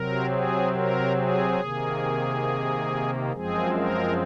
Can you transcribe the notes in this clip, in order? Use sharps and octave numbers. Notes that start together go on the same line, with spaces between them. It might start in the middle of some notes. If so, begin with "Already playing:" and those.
Already playing: C3 F#3 C4 A#4
G#4
A#4
G#4
C3 D#3 A#3
F#2 F3 G#3 C4 G#4
A#4